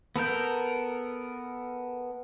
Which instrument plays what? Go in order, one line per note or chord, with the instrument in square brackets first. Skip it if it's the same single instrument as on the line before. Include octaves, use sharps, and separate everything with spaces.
[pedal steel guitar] B3 A4 A#4 G6